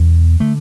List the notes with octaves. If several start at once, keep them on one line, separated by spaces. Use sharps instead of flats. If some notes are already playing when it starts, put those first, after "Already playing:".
Already playing: E2 B2
D3 A3